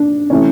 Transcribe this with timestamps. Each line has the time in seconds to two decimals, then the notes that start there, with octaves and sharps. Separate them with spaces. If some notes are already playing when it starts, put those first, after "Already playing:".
Already playing: D4
0.30 C3 E3 A3 C#4